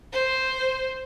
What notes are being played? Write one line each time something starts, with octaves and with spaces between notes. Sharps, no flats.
C5